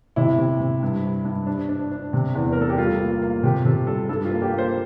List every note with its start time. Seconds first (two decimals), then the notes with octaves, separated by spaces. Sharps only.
0.16 C3 E4
0.38 C3
0.60 C3
0.82 G2
1.03 G3
1.25 G2
1.47 D4
1.69 D4
1.91 D4
2.13 C3
2.35 E2
2.52 A#4
2.57 A3 A4
2.70 G4
2.78 G3 F4
3.00 A#3
3.22 A#3
3.43 C3 G4
3.65 C3 A4
3.86 G3 A4
4.09 G2 A4
4.25 F4
4.31 A#3
4.42 G4
4.52 A#3
4.58 C5